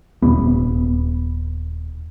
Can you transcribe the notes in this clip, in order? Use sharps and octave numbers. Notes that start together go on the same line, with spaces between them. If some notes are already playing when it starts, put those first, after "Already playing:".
D#1 B3